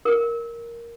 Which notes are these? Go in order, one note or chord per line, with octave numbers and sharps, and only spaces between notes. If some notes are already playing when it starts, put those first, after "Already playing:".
A#4